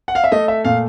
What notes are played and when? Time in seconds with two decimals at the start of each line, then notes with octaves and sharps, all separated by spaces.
0.08 F#5
0.15 F5
0.24 E5
0.32 A3 D#5
0.48 E5
0.65 A#2 F5